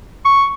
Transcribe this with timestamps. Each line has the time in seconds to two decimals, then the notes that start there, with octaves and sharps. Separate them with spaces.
0.25 C#6